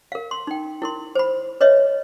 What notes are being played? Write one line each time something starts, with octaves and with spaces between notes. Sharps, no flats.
A#4 F5
C6
D#4 G5
E4 A#4 C6
C5 B5
B4 C#5 D#5 E5